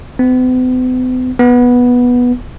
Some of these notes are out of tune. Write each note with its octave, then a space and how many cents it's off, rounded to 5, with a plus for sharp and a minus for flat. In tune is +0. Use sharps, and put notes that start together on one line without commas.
B3 +45
B3 -10